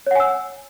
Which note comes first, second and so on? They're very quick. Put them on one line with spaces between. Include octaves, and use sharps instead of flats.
C#5 F#5 G#5 E6